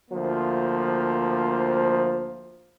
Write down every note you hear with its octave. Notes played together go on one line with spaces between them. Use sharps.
D2 F3 A#3 C5